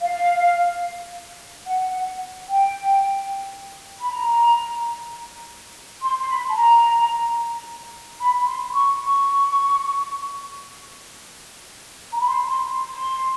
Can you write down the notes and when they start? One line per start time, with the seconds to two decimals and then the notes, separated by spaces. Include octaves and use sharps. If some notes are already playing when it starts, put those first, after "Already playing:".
0.01 F5
1.65 F#5
1.92 F#5
2.46 G5
3.99 B5
4.10 A#5
6.01 C6
6.19 C6
6.28 B5
6.49 A5
6.55 A#5
8.19 B5
8.46 C6
8.74 C#6
9.01 C#6
12.12 A#5
12.20 B5
12.27 C6
12.48 C6
12.68 C6
12.89 C6